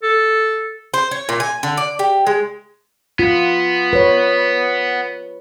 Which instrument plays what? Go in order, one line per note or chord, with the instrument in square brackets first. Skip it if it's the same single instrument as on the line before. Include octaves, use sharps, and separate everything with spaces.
[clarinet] A4
[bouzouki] C5
C#5
A#2
G#5
D3
D5
G4
G#3
[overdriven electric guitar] B3 [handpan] F4
[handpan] B4 C#5